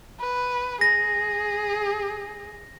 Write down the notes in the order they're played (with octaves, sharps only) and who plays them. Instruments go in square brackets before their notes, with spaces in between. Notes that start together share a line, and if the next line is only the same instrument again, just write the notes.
[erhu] B4
[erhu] G#4 [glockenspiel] A#6